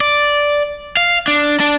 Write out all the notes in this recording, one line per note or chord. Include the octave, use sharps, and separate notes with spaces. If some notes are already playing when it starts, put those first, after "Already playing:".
D5
F5
D4
D4